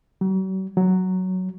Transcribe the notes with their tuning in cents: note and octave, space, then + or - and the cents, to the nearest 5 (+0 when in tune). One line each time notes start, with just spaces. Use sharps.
F#3 +45
F#3 +5